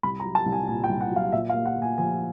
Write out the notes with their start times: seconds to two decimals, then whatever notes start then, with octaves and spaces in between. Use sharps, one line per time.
0.03 C2 B5
0.20 A#5
0.24 F#3
0.35 A5
0.46 C2
0.52 G#5
0.68 A#2 G#5
0.84 G5
0.89 C2
1.01 F#5
1.11 F#3
1.16 F5
1.32 A#2 E5
1.49 F5
1.54 A#3
1.65 F#5
1.77 A#2
1.82 G#5
1.98 F3 G#5